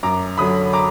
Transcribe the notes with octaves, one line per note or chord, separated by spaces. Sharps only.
F#2 A#5 D6
D3 F#3 B5 D#6
A#5 D6